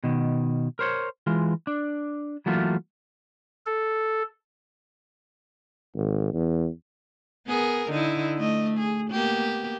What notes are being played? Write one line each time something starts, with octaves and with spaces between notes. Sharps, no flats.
B2 D#3
A#4 C5 C#5
E3 G#3 F4
D4
E3 F#3 A3 A#3 F4
A4
G#1
E2
B3 G#4 A#4
D3 D#4 E4
A3 D#5
G#4
A#3 B3 G4